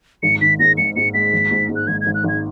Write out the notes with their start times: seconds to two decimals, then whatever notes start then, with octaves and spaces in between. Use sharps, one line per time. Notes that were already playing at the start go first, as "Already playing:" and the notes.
0.23 G#1 C#7
0.41 D#3 B6
0.59 G#2 A#6
0.78 G#1 C#7
0.96 G#2 C#7
1.14 G#3 B6
1.33 G#1
1.51 G#2
1.69 G#2
1.76 F#6
1.87 G#1 G#6
2.01 G#6
2.06 G#1
2.15 F#6
2.24 G#1 G#6